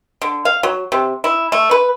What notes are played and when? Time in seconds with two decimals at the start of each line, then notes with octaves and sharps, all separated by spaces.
0.22 D3
0.45 F5
0.63 F#3
0.92 C3
1.24 E4
1.52 A3
1.71 B4